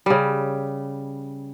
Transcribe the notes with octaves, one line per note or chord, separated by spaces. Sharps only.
C#3 G3